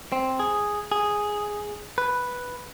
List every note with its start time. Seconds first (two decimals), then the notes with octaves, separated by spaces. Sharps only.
0.12 C4
0.40 G#4
0.92 G#4
1.98 B4